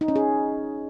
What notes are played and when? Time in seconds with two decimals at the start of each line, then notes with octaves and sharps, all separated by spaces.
0.01 D#4
0.08 C#4
0.16 G#4